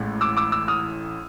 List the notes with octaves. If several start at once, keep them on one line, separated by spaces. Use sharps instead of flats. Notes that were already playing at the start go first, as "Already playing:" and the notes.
Already playing: A1 A2 G#3
D6 E6
D6 E6
D6 E6
D#6 F6